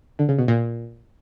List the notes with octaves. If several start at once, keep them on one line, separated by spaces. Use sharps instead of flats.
D3
C#3
B2
A#2